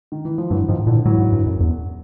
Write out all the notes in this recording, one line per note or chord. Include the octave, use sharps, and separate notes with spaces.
D#3
E3
F3
G2 E3 F#3
G#2 D#3 F3
A#2 D3 E3
A2 E3 F#3
G#2
G2
F#2
E2